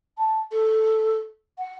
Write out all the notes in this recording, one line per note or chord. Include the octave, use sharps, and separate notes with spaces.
A5
A4
F#5